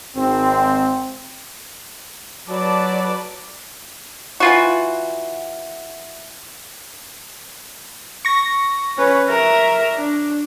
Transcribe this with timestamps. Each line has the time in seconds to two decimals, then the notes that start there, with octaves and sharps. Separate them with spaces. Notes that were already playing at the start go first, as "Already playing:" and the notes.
0.15 G#1 C4
2.49 F#3 B4 D5 A5
4.40 E3 F4 F#4
8.25 C#6 A#6
8.97 C#4 B4
9.29 A#4 E5
9.95 D4